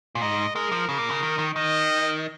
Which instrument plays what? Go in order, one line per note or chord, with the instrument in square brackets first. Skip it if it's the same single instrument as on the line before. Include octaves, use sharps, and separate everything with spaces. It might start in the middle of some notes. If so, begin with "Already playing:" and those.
[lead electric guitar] A#2
[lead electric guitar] G#2 [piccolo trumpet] D#5
[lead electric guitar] G#3 [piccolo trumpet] A#4
[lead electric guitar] F3
[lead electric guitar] C#3 [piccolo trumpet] A#4
[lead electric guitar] A#2
C#3
D#3
D#3
[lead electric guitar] D#3 [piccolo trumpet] D#5